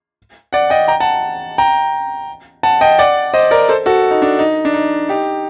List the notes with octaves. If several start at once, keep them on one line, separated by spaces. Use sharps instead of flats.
D5 F#5
D#5 G5
G5 A#5
F#5 A5
G5 A#5
F#5 A5
D#5 G5
D5 F#5
C5 D#5
A#4 D5
A4 C5
F#4 A4
D#4
D4
D#4
D4
D#4
D#4 G4